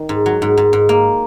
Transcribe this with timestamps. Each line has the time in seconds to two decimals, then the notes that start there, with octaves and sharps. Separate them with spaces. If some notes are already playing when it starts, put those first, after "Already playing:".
Already playing: D#3
0.09 G#2
0.26 F#3
0.42 G#2
0.57 G#2
0.73 G#2
0.89 A#3